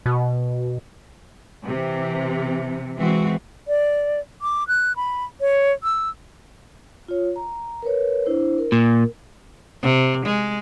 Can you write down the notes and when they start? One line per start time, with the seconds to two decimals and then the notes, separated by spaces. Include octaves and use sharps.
0.06 B2
1.66 C3 E3
2.98 E3 G#3 C4 F#4
3.68 D5
4.42 D6
4.68 F#6
4.96 B5
5.41 C#5
5.83 E6
7.08 F4 C#5
7.36 A#5
7.82 A#4 B4 C#5
8.26 D4 E4 C5
8.58 A#4
8.72 A#2
9.82 C3
10.26 G#3